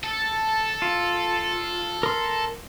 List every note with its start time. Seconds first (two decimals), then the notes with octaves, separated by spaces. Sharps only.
0.04 A4
0.82 F4
2.03 A#4 C6